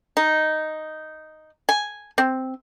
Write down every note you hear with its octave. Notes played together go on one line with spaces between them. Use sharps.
D#4
G#5
C4